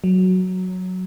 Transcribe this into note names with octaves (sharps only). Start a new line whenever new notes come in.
F#3